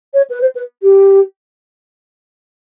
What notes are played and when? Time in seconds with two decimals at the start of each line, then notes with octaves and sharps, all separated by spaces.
0.14 C#5
0.30 B4
0.41 C5
0.55 B4
0.83 G4